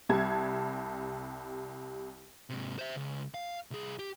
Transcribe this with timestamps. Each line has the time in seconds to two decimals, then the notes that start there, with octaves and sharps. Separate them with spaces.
0.09 C2 G3 A5 G#6
2.50 G#2 C3
2.79 C5 E5
2.96 C#2
3.34 F5
3.71 C2 G#4
3.99 G4